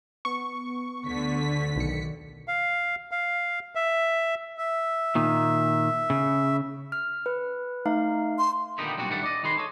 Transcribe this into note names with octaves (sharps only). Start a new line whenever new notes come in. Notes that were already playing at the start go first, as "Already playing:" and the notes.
B3 C#6
D2 D3 B6
B1 D#3 C#7
F5
F5
E5
E5
A#2 D#3
C#3
F6
B4
A3 D#4 F5
C6
A#2 D3 D#3 B3 D#4 G4
B1 A#2 G3 C4 D4 F#4
A2 D#3 G3 A3 D4 F#5
D5 D#5
D#3 D#4 G#4 B4 C6
A4 C#5 D#5